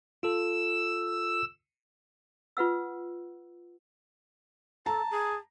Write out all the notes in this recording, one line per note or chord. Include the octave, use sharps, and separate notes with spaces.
F4 A4 E6
F4 B4 F#5 E6
A4 A5 A#5
G#4